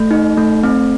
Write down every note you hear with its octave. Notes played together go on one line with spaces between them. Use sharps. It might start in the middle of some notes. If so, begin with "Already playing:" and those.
Already playing: A3
D#4
A3
C4